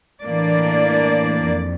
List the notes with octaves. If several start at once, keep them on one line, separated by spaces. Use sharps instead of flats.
A2 E3 A#3 D4 D5
F2